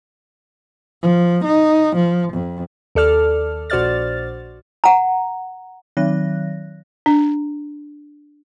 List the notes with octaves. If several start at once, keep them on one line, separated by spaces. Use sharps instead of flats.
F3
D#4
F3
F2
D#2 A4 D5 F6
A#1 F#4 C5 D5 F6 A6
F#5 A#5
D#3 F#3 F#6 A#6
D4